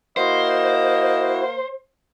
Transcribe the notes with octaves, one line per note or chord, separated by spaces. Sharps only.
A#3 E4 F#4 C5 D#5